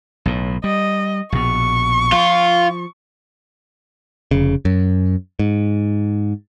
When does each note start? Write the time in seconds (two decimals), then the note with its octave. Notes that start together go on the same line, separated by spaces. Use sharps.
0.26 B1 A2
0.64 G3 D#5
1.32 A#1 B2 C#6
2.12 F3 F4
4.31 F1 C#3
4.65 F#2
5.39 G#2